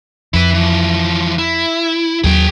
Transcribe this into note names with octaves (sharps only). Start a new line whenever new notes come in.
F2 E4 B4
E3 F3
E4
D#2 F#3 G#4 G5